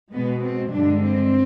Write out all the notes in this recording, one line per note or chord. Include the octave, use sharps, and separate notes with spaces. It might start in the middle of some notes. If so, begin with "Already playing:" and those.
B2 G#3 B3
C4
G2 D3 G#3 D4
C4